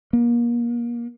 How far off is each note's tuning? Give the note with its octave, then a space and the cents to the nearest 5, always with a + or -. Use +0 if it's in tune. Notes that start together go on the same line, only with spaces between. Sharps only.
A#3 +30